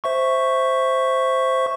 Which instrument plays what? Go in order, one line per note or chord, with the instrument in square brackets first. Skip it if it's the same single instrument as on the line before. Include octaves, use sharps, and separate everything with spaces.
[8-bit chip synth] C5 E5 C#6